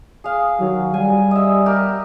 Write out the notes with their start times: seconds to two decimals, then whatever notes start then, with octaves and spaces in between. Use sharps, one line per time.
0.24 G#4 F5
0.59 D#3 F#3
0.94 G3 G#5
1.31 D#5 E5
1.66 G4 A#4